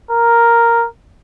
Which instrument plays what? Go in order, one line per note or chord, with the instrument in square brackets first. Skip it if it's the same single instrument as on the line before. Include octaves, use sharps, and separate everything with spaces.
[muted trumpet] A#4